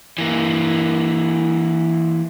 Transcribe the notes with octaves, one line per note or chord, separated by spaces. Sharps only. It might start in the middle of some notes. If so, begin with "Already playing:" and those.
E3 A#3